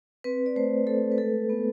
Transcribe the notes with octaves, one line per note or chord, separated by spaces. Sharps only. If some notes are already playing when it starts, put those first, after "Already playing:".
C4 B4
D5
A3 C5
A3 A4
B4
G#3 A4
B3